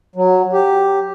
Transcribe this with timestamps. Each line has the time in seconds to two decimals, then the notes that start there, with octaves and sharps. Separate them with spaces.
0.16 F#3
0.53 G4